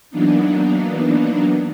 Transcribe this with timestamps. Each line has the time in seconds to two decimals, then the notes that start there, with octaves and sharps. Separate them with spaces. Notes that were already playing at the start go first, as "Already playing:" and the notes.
0.11 E3 F#3 A#3 B3 D4 D#4